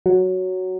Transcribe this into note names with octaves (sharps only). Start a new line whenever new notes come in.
F#3